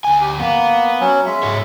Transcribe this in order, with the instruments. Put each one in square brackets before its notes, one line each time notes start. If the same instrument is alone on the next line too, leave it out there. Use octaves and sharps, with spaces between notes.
[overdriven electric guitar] D2 G#5
[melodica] G4
[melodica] A#3 [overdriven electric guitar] B3
[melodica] F#3 C#4
G#3 E5
[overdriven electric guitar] G#2 C#5